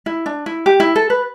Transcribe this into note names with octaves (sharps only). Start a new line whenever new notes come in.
E4
D4
E4
G4
E4
A4
B4